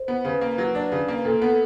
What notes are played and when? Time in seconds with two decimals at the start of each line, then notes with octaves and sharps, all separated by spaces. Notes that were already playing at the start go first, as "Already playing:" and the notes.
Already playing: C5
0.08 B3
0.24 C#3 B4
0.41 A#3
0.58 F#3
0.75 D4
0.92 C#3
1.08 A#3
1.25 A#2 A4
1.42 B3